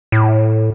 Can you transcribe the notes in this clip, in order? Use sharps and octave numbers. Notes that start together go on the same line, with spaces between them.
A2